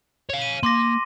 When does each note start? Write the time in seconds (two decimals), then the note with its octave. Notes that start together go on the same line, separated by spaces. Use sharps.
0.29 C#5 F5
0.42 D#7
0.63 A#3 C6 D6 A#6